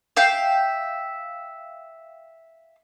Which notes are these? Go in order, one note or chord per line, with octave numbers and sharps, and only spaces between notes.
E5 F5 G5